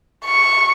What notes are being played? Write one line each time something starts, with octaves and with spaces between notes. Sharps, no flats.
C#6